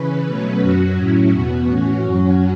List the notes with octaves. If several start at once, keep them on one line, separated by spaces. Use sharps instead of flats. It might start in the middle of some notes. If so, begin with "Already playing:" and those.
Already playing: C#3 E3 C#4 B4
B2 F#3 A3 C#4
F#2 F#3 C#4 F#4
A2 F#3 C#4 E4
E2 B2 B3 F#4
A2 E3 C#4
F#2 F#3 C#4